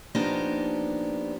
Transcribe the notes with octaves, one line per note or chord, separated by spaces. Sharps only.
F3 A#3 B3 D4 D#4 G4